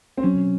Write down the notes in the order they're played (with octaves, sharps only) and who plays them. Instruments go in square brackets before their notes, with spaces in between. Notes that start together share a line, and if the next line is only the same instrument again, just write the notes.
[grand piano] C4
[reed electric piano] F#3 [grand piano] C#4